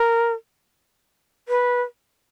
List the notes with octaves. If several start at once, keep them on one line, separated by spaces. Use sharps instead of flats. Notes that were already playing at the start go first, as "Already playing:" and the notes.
Already playing: A#4
B4